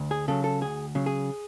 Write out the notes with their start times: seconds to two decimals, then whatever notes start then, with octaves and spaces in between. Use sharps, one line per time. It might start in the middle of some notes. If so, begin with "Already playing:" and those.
Already playing: D2
0.11 G#4
0.28 C#3 F#3 A4
0.44 A4
0.61 D2 G#4
0.95 C#3 F#3
1.06 G#4